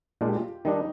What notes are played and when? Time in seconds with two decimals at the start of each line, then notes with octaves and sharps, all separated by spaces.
0.21 A#2 G#3 D4 F4
0.28 G4
0.36 F4
0.65 D#3 G3 D4 D#4